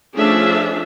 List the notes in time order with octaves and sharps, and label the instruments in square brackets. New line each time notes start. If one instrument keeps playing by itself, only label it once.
[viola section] F3 A3 C#4 D4 G#4 E5